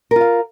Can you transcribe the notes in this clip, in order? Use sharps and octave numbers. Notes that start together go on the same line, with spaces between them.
F4 A#4 F5